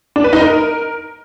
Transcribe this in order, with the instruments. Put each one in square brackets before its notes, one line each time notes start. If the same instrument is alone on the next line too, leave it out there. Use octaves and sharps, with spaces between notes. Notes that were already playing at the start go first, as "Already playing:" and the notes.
[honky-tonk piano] D4
B4
D#4
A#4